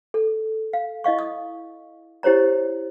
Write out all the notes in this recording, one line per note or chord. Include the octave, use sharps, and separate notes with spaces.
A4
F5
E4 D#5 F5 C#6
D#6
E4 G4 C5 C#5 A#5